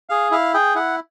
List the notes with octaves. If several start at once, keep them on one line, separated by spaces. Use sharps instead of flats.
G#4 F5
E4 F5
G#4 G5
E4 F#5